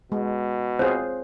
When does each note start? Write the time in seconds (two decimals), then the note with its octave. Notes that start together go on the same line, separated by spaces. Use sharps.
0.12 B2 G#3
0.79 C4 F4 G#4 C5 C#5